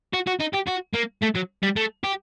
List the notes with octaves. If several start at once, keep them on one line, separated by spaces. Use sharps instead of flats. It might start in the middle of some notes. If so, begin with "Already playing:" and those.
F#4
F#4
D#4
G4
F#4
A#3
A3
F#3
G3
A3
G4